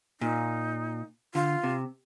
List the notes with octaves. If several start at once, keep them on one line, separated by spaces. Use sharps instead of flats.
A#2 D#4
D3 F4
C3